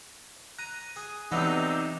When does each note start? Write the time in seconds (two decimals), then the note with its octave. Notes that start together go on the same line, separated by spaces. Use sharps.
0.58 A#5 F#6 D#7
0.96 G#4
1.32 C3 E3 F#3 A3 B3 D4 D#4 F#5